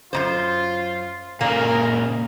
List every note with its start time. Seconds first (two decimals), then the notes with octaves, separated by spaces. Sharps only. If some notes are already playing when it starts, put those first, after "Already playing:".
0.13 F#2 B2 F4 C5
1.41 A#2 C#3 A#3 A#4